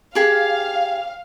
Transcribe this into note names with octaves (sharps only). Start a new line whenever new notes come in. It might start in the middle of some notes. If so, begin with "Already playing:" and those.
G4 G#4 F5